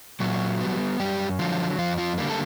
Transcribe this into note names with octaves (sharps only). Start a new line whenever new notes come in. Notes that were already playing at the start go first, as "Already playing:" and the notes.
A#2 F#3 F#4
G3 B3
F#2 G3 G4
D3 F3 F#3 F4
F2 F3 F4
F3 F4
D3 G3 A#3
A4